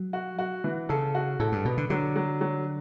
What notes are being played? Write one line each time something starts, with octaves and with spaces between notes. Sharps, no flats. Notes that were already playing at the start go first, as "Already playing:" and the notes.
Already playing: F#3
F#4
F#4
E3
C#3 A4
F#4
A2 A4
G2
B2 B3
D3
D3 F#3
F#3
F#3